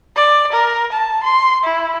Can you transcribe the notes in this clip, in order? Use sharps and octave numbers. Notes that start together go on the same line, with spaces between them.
D5
A#4
A5
C6
E4